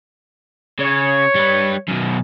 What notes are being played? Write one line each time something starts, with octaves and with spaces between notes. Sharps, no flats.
C#3 C#5
G3 B4
F#2 B2